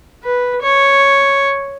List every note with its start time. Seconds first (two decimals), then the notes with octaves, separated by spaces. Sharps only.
0.24 B4
0.62 C#5